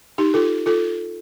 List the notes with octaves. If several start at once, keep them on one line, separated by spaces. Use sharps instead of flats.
D#4 G4
F4 A4
F4 A4